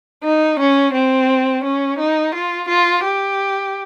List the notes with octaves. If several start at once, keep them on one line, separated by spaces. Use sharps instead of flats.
D#4
C#4
C4
C#4
D#4
F4
F4
G4